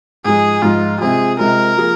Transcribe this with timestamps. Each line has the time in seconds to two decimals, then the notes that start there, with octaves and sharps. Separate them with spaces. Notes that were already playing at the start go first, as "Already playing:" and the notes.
0.25 G#2 F3 G#3 G#4
0.62 G#2 F3 G#3 F4
1.00 C3 G#3 C4 F4 G#4
1.39 C3 G#3 C4 F4 A#4
1.77 F3 A#3 F4 G#4